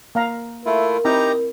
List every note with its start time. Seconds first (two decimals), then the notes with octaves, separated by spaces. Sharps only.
0.15 A#3 F5 A#5
0.66 A3 E4 F4 A#4
1.05 C4 D#4 E4 G4 A#5